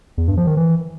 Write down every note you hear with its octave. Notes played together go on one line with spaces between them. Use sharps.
E2
G2
F3
D#3
E3